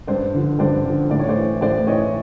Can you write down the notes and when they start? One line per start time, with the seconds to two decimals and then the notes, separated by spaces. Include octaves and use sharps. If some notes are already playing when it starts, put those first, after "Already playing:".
0.07 G2 C5 D5
0.34 D3 F3
0.59 G2 C5 D5
0.84 D3 F3
1.10 A2 D5
1.19 C#5
1.29 C5 D5
1.37 E3
1.61 A2 C5 D5
1.87 E3 C#5 D#5